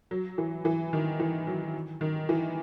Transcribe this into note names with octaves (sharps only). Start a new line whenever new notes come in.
F#3
E3
E3
D#3
E3
F#3
D#3
E3